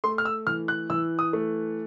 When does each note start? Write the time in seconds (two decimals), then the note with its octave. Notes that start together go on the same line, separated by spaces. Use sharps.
0.04 A3 C6
0.18 F6
0.25 E6
0.47 E3 F6
0.68 F#6
0.90 E3 E6
1.19 D#6
1.33 A3